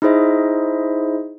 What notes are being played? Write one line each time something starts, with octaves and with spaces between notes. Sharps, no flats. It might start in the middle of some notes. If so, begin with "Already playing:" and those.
D#4 E4 G#4 C5 D#5 E5